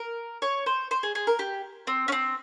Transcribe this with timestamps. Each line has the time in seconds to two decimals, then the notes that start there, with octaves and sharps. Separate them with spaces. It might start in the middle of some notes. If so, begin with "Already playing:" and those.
Already playing: A#4
0.42 C#5
0.66 C5
0.91 C5
1.03 G#4
1.15 G#4
1.27 A#4
1.39 G4
1.87 C4
2.08 C#4
2.12 C4